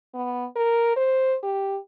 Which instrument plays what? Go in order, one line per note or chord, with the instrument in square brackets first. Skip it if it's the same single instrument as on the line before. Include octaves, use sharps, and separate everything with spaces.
[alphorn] B3
A#4
C5
G4